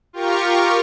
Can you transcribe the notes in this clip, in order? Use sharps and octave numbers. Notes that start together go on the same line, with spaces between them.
F4 G4 A#4 C#6